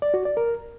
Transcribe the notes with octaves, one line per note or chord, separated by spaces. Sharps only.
D5
F#4
D5
A#4